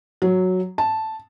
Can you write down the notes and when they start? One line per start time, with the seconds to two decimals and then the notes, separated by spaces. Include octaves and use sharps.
0.22 F#3
0.78 A5